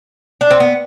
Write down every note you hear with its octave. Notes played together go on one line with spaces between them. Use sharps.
D4
C4
B3